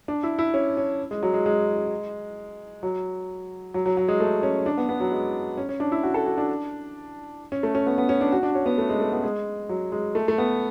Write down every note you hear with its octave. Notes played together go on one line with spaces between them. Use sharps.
D4
E4
E4
C#4
C#4
G#3
F#3
G#3
G#3
F#3
F#3
F#3
F#3
G#3
A3
C#4
D4
B3
B3
F#3
G#3
C#4
C#4
D4
E4
F#4
A4
F#4
D4
C#4
A3
C#4
B3
B3
C#4
D4
F#4
D4
C#4
B3
A3
G#3
A3
B3
G#3
F#3
G#3
A3
A3
B3